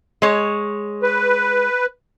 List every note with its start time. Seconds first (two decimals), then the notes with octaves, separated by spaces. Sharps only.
0.22 G#3 C#5
1.03 B4